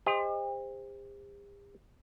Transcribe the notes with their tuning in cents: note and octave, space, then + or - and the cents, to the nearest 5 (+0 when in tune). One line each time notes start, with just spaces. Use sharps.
G4 +45 C5 +0 D#5 +0